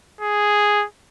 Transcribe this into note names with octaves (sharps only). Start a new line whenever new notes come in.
G#4